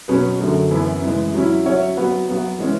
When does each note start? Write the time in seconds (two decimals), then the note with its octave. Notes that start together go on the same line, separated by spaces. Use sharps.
0.08 B2 F#3 C#4 G#4 B4
0.39 F#2 D3 F#3 A3
0.71 F#2 E3 B3 E4
1.02 C#3 E3 G#3
1.34 F#3 C#4 E4
1.65 F#3 C#4 F#4 C#5 E5
1.97 F#3 B3 F#4 B4
2.28 F#3 B3 F#4
2.59 E3 G#3 C#4